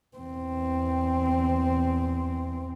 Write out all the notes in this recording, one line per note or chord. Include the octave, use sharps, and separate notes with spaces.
E2 C4